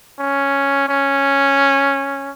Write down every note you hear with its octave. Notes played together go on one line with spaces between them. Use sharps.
C#4
C#4